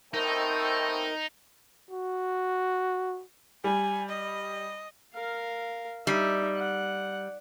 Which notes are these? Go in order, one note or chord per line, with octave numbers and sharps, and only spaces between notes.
B2 A3 C4 D#4 A#4
F#4
G3 G#5
D#5
A#4 F5
G3 D#4 E5
F#5